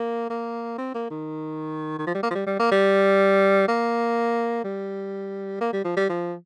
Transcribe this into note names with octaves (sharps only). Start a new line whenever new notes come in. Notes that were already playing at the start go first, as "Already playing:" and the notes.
Already playing: A#3
A#3
C4
A#3
D#3
D#3
F3
G3
A#3
F3
G3
G3
A#3
G3
A#3
G3
A#3
G3
F3
G3
F3